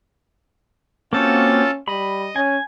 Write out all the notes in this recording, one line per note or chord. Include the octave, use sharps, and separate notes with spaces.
A#3 C4 C#4 F4 F#4 A4 A5
G3 D#5 B5
C#4 G#5